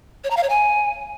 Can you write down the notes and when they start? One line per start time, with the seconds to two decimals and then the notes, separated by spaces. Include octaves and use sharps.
0.24 C#5
0.30 A#5
0.37 F5
0.43 C#5
0.50 G#5